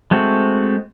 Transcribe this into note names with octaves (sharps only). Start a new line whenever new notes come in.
G#3 A3 C4 F#4